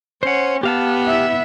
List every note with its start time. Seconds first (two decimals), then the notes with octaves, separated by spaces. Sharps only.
0.23 C#4 C5 F#5
0.63 B3 G4 F5 A5
1.06 E4 E5